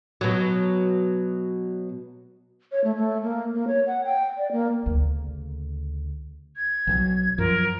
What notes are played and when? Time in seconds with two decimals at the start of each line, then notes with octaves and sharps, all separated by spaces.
0.21 B2 F#3
2.72 C#5
2.84 A3
2.96 A3
3.23 A#3
3.54 A#3
3.68 C#5
3.87 F#5
4.05 G5
4.38 D5
4.52 A#3
4.86 D2 C#3
6.57 G#6
6.87 B1 D#3 F#3
7.38 F#2 F3 A#4